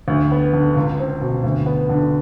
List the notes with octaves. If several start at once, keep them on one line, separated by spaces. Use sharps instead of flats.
D2
B3
D3
C#2
C4
B2
D2
B3
D3